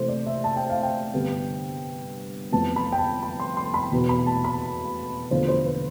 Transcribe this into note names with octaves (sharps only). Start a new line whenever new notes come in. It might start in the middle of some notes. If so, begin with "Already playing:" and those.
Already playing: C3 E3 A3 C5
D5
E5
A5
G5
F5
G5
G2 D3 G3 B3
F2 E3 B3 A5
B5
G5
A5
B5
C6
C6
B5
E2 B2 B3
B5
A5
B5
E2 D3 F3 B3 F4 C5
C5
B4